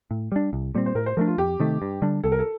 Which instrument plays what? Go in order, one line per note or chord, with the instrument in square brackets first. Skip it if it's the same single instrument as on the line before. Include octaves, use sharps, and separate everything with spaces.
[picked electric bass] A2
G3 D4
C2
A#2 G3 C4
[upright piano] C5
[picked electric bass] A2 [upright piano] A#4
[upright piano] C5
[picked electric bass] F3 A3 D4 [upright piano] A#4
[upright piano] F4
[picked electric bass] F2 [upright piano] G4
[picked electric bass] C3 D#3 A3
G2
D3 G3 D4
[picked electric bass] C2 [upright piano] A4
[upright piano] A#4
A4